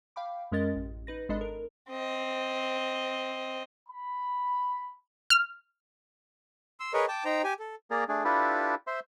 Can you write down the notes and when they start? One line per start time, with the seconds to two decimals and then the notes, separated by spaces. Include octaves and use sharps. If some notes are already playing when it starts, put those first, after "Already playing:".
0.16 F5 G5 B5 D6
0.52 F#2 G#3 C#4 A#4 D#5 A6
0.76 A1
1.07 D#4 B4 A#6
1.29 G#1 G#3 D4 A4 D#5 B5
1.41 A#4
1.89 C4 D#5
3.89 B5
5.30 F6
6.80 C6 E6
6.94 G#4 A#4 B4 C#5 D#5
7.08 G5 A5 D6
7.25 D#4 C5 G5 A#5
7.44 G4 G#5
7.59 A4
7.91 A#3 G#4 A#4 D5 A#5
8.09 A3 D4 G#4
8.24 D4 E4 F4 G4 A4 B4
8.87 C5 E5 C6